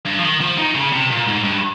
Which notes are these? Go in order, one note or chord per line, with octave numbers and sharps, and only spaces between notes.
G2
F3
D#3
F3
D#3
C#3
C3
A#2
G#2
G2